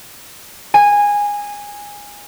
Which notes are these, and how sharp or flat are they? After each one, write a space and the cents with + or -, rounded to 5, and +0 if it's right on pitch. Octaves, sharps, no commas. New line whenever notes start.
G#5 -15